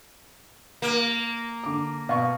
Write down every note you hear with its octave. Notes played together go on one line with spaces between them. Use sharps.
A#3
D3 D6
B2 F5 F#5 C#6